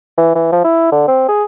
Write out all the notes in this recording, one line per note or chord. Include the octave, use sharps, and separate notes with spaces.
E3
E3
F3
E4
D3
C4
G#4